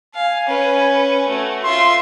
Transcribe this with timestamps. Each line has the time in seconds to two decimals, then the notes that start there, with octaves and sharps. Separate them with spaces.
0.15 F5 G#5
0.47 C#4 B4
1.29 A3 F#4
1.64 F4 E5 C6